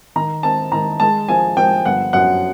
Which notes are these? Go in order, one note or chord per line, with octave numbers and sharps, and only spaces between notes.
D#3 A#5
C4 A5
D#3 A#5
G#3 A5
F3 G#5
F3 G5
G1 F#5
F#2 F#5